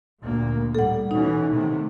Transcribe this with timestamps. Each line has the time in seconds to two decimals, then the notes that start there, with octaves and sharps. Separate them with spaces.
0.23 D2 A#2 A#3
0.75 A2 G3 A4 F#5
1.11 B2 E3 C#4 D#4
1.51 C3 D#3 A3